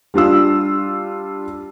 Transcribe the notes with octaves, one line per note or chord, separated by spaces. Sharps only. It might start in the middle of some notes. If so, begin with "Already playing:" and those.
G3 D4 F4 E6